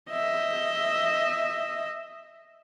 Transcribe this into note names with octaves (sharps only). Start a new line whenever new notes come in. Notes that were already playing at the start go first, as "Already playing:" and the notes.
D#5 E5